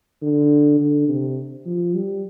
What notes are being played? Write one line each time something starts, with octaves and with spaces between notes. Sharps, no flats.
D3
D3
C3
F3
G3